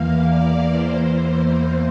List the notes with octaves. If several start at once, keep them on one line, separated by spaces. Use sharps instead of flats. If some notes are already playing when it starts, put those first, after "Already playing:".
Already playing: E2 E3 A#3 F5
D5
E2 E3 A#3 C5